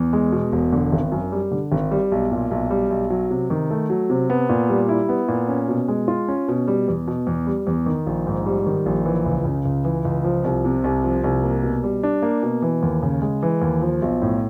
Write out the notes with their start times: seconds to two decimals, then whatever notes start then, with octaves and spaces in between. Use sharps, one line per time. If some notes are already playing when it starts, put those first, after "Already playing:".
Already playing: E2
0.13 G#3
0.32 B2
0.52 E1
0.72 D3
0.92 G#1
1.12 F#2
1.32 G3
1.51 D3
1.72 G#1
1.91 G3
2.12 B1
2.31 A#2
2.51 B1
2.70 G3
2.90 B1
3.10 F#3
3.31 C3
3.50 D#3
3.70 A3
3.90 F#3
4.10 C3
4.30 B3
4.49 A#2
4.69 G3
4.89 E4
5.09 B3
5.28 A#2
5.49 C#4
5.68 B2
5.88 G#3
6.08 F4
6.28 C#4
6.48 B2
6.68 G3
6.88 E2
7.07 B2
7.27 E2
7.47 G3
7.67 E2
7.86 D#3
8.06 A#1
8.27 G#2
8.46 G3
8.66 D#3
8.86 A#1
9.06 E3
9.26 C#2
9.45 C#3
9.65 C#2
9.85 E3
10.05 C#2
10.24 F3
10.44 C2
10.65 C3
10.84 C2
11.04 F3
11.24 C2
11.44 A#3
11.63 B2
11.84 G3
12.03 D4
12.22 A#3
12.43 B2
12.62 E3
12.83 D#2
13.02 C#3
13.22 G#3
13.43 E3
13.62 D#2
13.81 F3
14.02 B1
14.22 A2